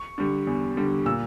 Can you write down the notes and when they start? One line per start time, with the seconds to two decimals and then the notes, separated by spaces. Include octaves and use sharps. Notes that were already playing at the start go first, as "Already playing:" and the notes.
Already playing: C#6
0.18 D3 G3
0.47 E2
0.77 D3 G3
1.06 A#2 E6